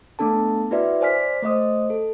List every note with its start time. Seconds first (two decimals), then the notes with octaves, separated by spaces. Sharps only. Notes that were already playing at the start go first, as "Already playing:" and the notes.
0.19 A3 B3 D4 A4 A5
0.71 E4 F#4 B4 D5 E5
1.01 C5 D5 G#5 F6 B6
1.42 A3 C5 D#5 D#6
1.90 A4